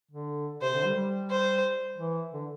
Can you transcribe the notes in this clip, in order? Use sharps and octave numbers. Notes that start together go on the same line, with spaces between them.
D3
C3 C5
D3
G3
G3
C5
E3
D3